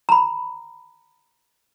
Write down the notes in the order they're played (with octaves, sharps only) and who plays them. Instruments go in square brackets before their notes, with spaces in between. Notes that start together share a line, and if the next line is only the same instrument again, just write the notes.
[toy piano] A#5 B5